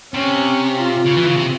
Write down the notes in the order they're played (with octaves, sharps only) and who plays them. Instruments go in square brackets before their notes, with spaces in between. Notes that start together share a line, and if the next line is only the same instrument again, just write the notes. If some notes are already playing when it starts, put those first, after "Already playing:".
[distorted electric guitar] C3 [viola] C#4
[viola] F4
[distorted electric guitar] C#3
E3
C#3
C3